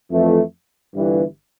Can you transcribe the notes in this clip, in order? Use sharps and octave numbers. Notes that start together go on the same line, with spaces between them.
F2 E3 A3
G1 G2 E3